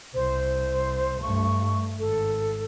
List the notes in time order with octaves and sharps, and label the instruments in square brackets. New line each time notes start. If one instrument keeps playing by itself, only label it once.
[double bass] C2 [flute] C5
[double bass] G2 A3 [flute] C#6
[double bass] G#1 [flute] A4